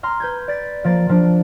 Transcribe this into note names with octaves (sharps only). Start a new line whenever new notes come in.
A#5 C6 F6
B4 G6 G#6
D5 A6 B6
F3 A#3 D5 A6
F3 D4